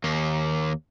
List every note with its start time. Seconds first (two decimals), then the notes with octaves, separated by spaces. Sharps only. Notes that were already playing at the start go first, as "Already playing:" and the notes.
0.04 D#2 A#3